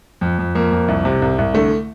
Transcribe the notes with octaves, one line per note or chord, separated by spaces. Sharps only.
F2
F2
F2 A#3
F2
C2
C3
C2
C2
D3 A3